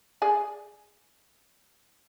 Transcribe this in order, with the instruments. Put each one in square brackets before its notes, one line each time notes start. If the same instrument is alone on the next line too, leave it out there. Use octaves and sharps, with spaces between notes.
[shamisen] G#4 D5 G#5